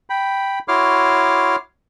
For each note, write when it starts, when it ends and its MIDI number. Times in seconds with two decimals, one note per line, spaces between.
0.10 0.59 79
0.10 0.59 83
0.68 1.56 64
0.68 1.56 66
0.68 1.56 73
0.68 1.56 84
0.68 1.56 86
0.68 1.56 89